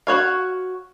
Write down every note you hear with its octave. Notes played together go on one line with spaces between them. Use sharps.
F#4 C#5 F5